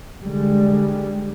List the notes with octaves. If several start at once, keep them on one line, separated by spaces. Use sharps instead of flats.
D3 G3 G#3